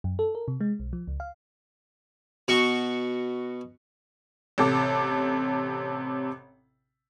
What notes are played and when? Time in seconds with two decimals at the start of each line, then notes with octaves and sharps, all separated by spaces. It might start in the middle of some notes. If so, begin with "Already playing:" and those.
0.04 F#2
0.19 A4
0.35 A#4
0.48 C3
0.61 G#3
0.80 B1
0.93 F3
1.07 C#2
1.20 F5
2.48 B2 F#4 C#6
4.58 A1 C3 A4 D6